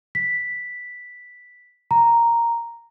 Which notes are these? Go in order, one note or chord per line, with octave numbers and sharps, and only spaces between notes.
B6
A#5